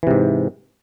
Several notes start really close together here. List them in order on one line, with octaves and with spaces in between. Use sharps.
E3 C3 G#2